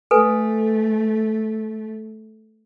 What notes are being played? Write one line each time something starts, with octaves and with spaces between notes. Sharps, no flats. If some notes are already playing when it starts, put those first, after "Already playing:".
A3 A4 B4 G#5